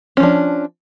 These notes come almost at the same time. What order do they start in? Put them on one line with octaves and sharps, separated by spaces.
C#4 F3 D4